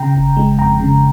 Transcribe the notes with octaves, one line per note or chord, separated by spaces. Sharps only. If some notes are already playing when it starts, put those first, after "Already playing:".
Already playing: C#3 G5 A#5
G1
G#3
F2 G5 A#5
C#3